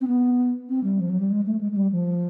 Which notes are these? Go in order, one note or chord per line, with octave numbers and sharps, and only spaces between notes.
C4
B3
C4
G3
F3
F#3
G3
G#3
A3
G#3
G#3
G3
F3